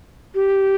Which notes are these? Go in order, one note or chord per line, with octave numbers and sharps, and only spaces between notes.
G4